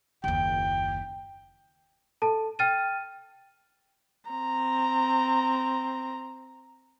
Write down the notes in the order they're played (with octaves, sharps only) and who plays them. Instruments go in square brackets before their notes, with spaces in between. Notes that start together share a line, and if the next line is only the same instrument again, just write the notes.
[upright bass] F#1 D#2 [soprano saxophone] G5
[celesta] A4 A5
G5 F6 A6 D#7
[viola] C4 A#5